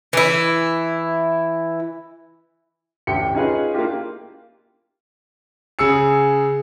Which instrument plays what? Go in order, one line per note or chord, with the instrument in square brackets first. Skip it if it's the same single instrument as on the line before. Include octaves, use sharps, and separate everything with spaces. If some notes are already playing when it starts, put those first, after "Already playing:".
[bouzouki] E3 E4
[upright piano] A1 D2 G4 G5 C#7
C#4 D#4 F4 G#4 B4 D#5
A#3 D4 E4 F4 G4
[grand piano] C#3 G#4 E6 C#7